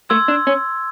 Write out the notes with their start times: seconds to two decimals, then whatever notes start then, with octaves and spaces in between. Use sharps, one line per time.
0.10 A3 C6 E6 G#6
0.28 D4
0.47 C#4